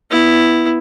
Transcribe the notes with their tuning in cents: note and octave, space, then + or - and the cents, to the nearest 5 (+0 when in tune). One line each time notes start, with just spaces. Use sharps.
B3 +0 E4 +0